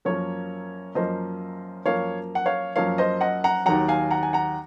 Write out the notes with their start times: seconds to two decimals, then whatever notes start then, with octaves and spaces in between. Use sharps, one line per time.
0.05 F#2 F3 A#3 A#4 C#5
0.95 F#2 F3 A#3 C5 D#5
1.85 F#2 F3 A#3 C#5 F5
2.35 F#5
2.46 C#5 F5
2.76 F#2 F3 A#3 C#5 F5
2.98 C5 D#5
3.21 D#5 F#5
3.44 F#5 A#5
3.66 D#2 D#3 F#3 F#5 A#5
3.88 F5 G#5
4.11 F#5 A#5
4.23 G#5
4.33 F#5 A#5